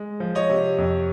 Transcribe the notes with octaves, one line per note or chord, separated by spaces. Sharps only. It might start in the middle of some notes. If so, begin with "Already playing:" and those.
Already playing: G#3
F3
C#5 D#5
C3
F2